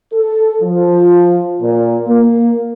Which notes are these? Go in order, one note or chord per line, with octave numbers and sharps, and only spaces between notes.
A4
F3
A#2
A#3